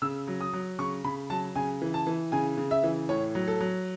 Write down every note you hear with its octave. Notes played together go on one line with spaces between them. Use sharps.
C#3 E6
F#3
D#6
F#3
C#3 C#6
C#3 B5
F#3 A5
C#3 G#5
E3
A5
E3
C#3 G#5
C#3
E5
E3
A2 C#5
F#3
A4
F#3